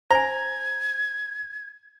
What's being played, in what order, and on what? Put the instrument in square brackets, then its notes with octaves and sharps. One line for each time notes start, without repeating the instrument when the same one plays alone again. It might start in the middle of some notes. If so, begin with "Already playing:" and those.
[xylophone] C5 G#5 [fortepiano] A#5 [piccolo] G#6